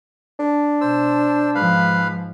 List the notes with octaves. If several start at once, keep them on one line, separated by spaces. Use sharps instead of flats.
D4
B2 C5 E6
G#2 F3 B4 F5